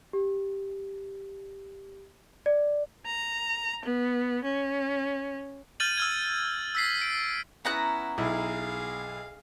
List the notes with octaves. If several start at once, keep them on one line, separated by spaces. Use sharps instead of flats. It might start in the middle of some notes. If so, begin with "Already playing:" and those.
G4
D5
A#5
B3
C#4
F6 G6 A6 D#7 F#7
E6 F6 G#6
E6 B6 C7
D7
B3 C#4 E4 A#5 F#6
B1 E4 G#4 F5